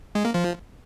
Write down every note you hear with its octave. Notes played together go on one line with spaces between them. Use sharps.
G#3
A#3
F3